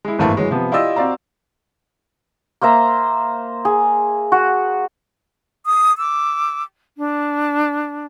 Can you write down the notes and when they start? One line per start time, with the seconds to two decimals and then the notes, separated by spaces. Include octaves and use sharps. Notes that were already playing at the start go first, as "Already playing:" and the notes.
0.05 G#3 E4
0.19 G#1 G2 E3 A3 A#3
0.37 E3 F#3 G#3
0.51 C3 F3 B3
0.72 E4 F4 G4 D5 D#5 E6
0.96 C4 F#4 D5 F5 A#5
2.61 A#3 C5 E5 A#5
3.65 G#4
4.32 F#4
5.65 D#6
5.98 D6 E6
6.97 D4